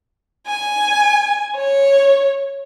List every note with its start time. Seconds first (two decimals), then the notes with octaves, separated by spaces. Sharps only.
0.46 G#5
1.56 C#5